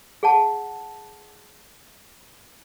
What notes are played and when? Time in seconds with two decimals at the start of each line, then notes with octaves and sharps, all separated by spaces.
0.23 G#4 F#5 A5